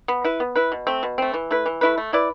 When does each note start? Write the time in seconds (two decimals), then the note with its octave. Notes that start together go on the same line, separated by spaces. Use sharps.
0.08 B3
0.24 E4 B4
0.40 B3
0.56 E4 B4
0.72 B2
0.87 A3 C4
1.03 B2
1.18 A3 C4
1.34 E3
1.51 A3 E4 B4
1.66 E3
1.81 A3 E4 B4
1.98 A3
2.13 E4 B4 D5